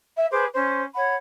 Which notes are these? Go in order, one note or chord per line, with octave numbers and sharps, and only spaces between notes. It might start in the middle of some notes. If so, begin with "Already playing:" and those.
E5
G#4 B4 C5 D6
C#4 C5
C#5 F#5 B5